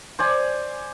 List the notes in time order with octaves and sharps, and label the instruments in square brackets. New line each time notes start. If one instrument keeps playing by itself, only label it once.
[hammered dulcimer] C5 D5 G#5